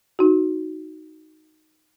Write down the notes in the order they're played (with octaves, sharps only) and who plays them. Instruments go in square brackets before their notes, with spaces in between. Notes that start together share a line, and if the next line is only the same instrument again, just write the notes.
[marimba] D#4 F#4